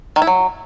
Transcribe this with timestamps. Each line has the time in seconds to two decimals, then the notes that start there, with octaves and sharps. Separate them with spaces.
0.16 D#3
0.22 E4
0.27 F#3